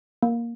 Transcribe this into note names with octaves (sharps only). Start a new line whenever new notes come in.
A#3